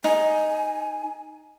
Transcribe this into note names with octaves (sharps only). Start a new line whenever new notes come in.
D#4 G#5